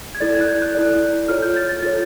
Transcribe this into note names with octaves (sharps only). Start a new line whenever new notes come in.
G#6
E4 A4 D5 A6
G#6
F#6
G6
F#6
E4 A4 D5
F4 A4 C#5 F6
G6
A6
A6
F4 A4 C#5 A6